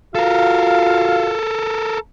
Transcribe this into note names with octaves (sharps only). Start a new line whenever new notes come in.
F4 F#4 A4 A#4 F5